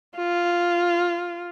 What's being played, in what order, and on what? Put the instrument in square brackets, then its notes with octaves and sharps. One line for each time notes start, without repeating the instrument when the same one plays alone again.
[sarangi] F4